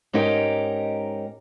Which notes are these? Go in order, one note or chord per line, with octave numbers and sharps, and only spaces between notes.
G#2 C#4 D#4 G4 A#4